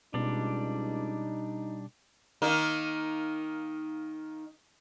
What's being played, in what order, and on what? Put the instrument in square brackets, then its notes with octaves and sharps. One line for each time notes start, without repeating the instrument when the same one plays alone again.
[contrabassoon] C#2 [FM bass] B2 [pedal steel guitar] G3 D4 [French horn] D#4
[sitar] D#3 A#3 D#4